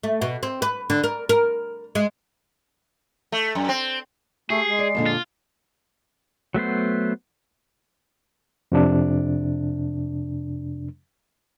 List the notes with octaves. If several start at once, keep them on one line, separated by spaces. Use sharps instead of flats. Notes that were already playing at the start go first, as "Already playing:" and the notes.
A3
B2
C4
B4
D3
A#4
A#4
G#3
A3
F#2
C4
A3 G4 G#4 C7
G#3
D5
F2 A#2 D3
F4
F#3 A3 B3 C5
F2 C3 D4